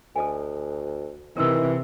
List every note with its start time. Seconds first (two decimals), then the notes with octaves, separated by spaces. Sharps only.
0.16 D2 A4 D#5 G#5
1.37 C3 D#3 E3 A#4 C6 E6